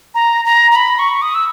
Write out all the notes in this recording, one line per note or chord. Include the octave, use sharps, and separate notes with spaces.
A#5
A#5
A#5
B5
C#6
D#6
E6